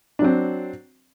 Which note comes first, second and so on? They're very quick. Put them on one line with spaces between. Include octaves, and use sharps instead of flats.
D4 F#3 C4